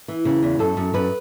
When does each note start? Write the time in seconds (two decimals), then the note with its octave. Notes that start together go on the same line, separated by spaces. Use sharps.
0.08 E3
0.25 C#3
0.43 E2
0.59 F#2 A4
0.77 F#2
0.94 F#2 B4